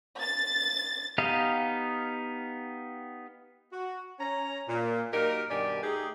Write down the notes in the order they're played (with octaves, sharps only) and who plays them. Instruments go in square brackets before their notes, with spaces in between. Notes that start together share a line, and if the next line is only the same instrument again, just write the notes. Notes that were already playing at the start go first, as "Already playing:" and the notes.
[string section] A6
[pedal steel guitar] B3 D#4 G4 D#5 F5
[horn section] F#4
C#4 A#5
A#2
F#3 A#3 D#4 G4 A#4
G2 B2 D#3 G4 D5 G#5
A3 D#4 G4 G#4